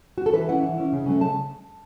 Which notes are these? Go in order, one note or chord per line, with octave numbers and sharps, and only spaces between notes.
F#4
A4
E3 B4
C#4 E4 F#5
E3
C#4 E4
C#3
F#3 A3 C#4
C#3 A5